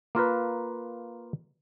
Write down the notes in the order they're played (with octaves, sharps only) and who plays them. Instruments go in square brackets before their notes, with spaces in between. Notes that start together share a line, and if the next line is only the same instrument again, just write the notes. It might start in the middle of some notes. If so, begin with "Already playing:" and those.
[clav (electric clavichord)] A#3 F4 A#4 B4